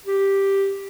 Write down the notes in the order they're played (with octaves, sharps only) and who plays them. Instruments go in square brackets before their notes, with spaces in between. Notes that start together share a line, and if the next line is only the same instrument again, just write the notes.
[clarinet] G4